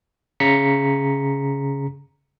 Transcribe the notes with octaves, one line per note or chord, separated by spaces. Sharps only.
C#3 A#5 B6 C#7